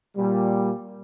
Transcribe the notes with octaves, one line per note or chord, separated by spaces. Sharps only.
A#2 G3